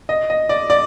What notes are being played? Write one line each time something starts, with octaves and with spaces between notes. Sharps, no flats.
D#5
D#5
D5
D5